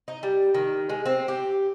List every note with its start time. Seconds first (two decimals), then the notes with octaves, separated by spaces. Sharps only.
0.08 D#4
0.23 G3
0.54 D#3
0.89 G#3
1.06 C4
1.28 G4